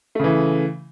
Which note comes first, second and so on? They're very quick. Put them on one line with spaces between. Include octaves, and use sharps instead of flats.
A3 C#3 E3